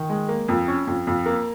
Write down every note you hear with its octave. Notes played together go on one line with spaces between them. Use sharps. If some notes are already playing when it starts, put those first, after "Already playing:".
Already playing: D#3
G#3
A#3
F2
C#4
F2
F2
A#3